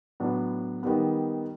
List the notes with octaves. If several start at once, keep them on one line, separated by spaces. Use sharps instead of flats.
A2 F#3 B3 D4
D#3 G3 B3